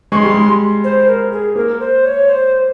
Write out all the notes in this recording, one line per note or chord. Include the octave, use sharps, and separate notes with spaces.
G#3 C6 C#6
G3
G#3
C5
A#4
G#4
A#3 A#4
C5
C#5
C5